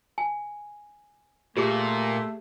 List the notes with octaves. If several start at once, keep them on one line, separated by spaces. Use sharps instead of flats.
G#5
A#2 A3 G4 G#4 D6